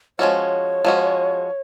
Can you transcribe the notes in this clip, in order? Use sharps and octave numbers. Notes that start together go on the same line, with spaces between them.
F3 G#3 C#4 F#4 C#5
F3 G#3 C#4 F#4